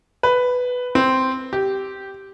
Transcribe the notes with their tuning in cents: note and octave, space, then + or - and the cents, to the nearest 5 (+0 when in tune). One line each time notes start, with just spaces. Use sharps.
B4 +5
C4 -5
G4 -10